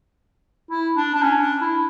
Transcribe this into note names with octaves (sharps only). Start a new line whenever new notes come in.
E4
D4
D4
C#4
D4
E4